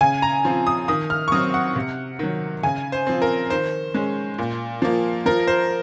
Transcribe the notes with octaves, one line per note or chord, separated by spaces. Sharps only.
C#3 G#5
A#5
F3 C4
D#6
D#3 D#6
F6
C#6
F#3 C4 D#6
F#5
C3
D#3 F#3
C#3 G#5
C5
F3 C4
A#4
D#3 C5
G#3 C#4
A#2
F3 A#3
F3 A#4
C5